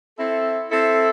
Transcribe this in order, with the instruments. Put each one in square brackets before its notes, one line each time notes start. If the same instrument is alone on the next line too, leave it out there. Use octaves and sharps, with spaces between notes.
[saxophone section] C4 E4 A4
C4 E4 A4